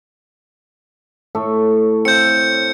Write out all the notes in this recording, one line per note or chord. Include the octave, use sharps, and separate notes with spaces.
A2 A4 C#5
C4 F5 G6 C#7